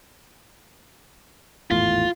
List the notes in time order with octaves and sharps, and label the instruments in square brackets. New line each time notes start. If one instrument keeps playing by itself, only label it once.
[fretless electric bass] G#1 E2 A2 [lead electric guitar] F4